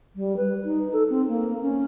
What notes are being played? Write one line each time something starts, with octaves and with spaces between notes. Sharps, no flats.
G3
B4
D#4
A4
C4
A#3
C#4